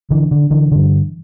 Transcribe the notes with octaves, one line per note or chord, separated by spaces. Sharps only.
D3 E3
D3
D3 E3
G2 D3